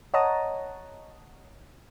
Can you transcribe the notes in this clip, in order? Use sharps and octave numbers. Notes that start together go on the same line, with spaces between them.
C#5 D#5 F#5 A5 A#5 D#6